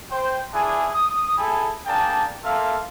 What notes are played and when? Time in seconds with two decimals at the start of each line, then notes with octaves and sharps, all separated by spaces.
0.11 C5 G5
0.53 D4 E4 G#4
0.93 D#6
1.37 E4 G#4 A4 G#5 B5
1.86 A#3 D4 G#4 G5 A5
2.44 A#3 A4 E5 F5 C6